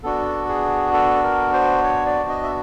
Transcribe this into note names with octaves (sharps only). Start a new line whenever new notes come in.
B3 D4 F#4 A4
G#4
A4
A#4
C5
C#5
D5
D#5
E5